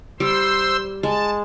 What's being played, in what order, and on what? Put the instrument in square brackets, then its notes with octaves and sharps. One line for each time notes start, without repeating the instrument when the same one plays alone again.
[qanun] G3 [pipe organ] C5 C6 E6
[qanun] G#3 [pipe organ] A5